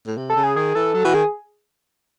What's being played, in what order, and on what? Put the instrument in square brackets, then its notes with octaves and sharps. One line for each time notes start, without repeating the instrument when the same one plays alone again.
[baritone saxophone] A2
C3
[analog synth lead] A4
[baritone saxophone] C#3
[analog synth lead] G#4
[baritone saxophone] D#3 [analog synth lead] G#4
[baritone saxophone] E3 [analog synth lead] A4
[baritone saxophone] F#3 [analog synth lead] A4
[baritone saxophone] E3 [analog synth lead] F#4
[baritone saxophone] D#3 [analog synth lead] G#4